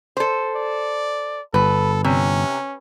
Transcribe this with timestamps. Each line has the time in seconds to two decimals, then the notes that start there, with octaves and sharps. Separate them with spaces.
0.17 A4 C5
0.56 D5
1.54 G1 A4 B4
2.04 C3 C#4